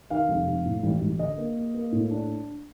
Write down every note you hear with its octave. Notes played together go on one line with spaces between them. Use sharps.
D#3 F5
F1
F1
A2
A1
A1
D3 D#5
A#3
A#3
A#3
A2
D4